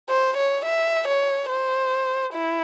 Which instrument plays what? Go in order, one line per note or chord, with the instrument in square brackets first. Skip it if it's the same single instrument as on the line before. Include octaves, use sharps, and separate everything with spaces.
[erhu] C5
C#5
E5
C#5
C5
E4